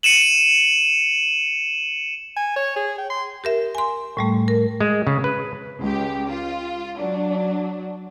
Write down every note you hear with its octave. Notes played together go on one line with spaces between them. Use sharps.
C#7 D#7 E7 F#7
G#5
C#5
G#4
G5
C6
G4 A#4 E5
G#5 C6
A2 G3 A3
A#4
G#3
C#3
B4
C#2 G4
F4
F#3 D4